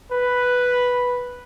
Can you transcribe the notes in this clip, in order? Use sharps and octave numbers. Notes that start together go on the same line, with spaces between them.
B4